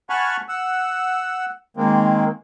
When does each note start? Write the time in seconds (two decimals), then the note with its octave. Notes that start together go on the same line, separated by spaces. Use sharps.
0.10 F#5 G#5 A5 B5 C#6 F6
0.49 F#5 E6
1.77 D#3 G#3 A#3 C4